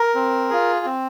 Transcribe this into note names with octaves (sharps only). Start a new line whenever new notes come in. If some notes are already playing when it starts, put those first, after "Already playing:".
Already playing: A#4
C4
F4 G#4
C4